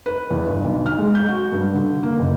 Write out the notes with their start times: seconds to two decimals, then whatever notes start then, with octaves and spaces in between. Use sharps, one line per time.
0.06 B4
0.31 E2
0.47 G1
0.64 B1
0.86 F6
0.98 G#3
1.15 G6
1.28 F#4
1.52 G2
1.74 D3
2.03 A#3
2.19 F#1